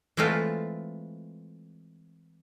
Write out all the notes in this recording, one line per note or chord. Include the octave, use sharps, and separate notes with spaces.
E3 G#3 A3 C4 F4